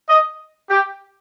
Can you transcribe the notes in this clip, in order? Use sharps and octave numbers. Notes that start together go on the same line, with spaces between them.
D#5
G4